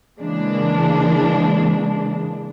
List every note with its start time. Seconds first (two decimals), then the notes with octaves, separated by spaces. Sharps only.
0.19 C#3 E3 G#3 A#3 D4